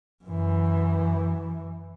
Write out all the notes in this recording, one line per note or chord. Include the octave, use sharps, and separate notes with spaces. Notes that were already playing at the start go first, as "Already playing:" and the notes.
F#2 E3